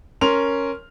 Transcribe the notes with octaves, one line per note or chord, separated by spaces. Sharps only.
C#4 A#4 C6 F7